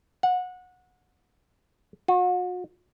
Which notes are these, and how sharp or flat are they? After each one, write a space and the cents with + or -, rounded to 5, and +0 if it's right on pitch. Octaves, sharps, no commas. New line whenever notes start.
F#5 -20
F#4 -40